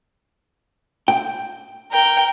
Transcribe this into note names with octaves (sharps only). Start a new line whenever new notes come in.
G5
A#4 G5